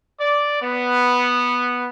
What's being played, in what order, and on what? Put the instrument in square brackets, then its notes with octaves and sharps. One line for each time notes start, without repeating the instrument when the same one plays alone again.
[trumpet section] D5
B3